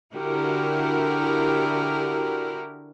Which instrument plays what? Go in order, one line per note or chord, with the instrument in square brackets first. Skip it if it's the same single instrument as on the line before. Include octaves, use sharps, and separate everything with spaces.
[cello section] D3 E4 F#4 G4 A#4